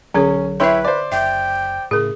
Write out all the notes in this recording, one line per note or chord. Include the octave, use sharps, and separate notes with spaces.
B1 D3 F#3 C#4 G#4 C#5
E4 B4 C#5 E5 G5 C6
C5 D5
F#1 E5 G5
A2 C#3 G#4 A#4